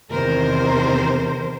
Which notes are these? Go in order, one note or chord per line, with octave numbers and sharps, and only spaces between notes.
E2 C3 D#3 A#4 C5